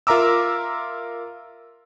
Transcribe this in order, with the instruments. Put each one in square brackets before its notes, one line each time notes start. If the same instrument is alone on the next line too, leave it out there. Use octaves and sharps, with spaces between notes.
[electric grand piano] F4 A#4 E5 A#5 D6 E6